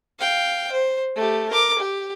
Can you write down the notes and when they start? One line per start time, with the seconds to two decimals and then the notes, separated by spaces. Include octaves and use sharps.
0.19 F5 G5
0.71 C5
1.15 A3 G4
1.49 A#4 D6
1.78 G4